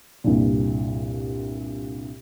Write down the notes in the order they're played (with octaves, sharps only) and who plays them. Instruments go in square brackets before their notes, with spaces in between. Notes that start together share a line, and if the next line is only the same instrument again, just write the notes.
[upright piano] C2 G2 A#2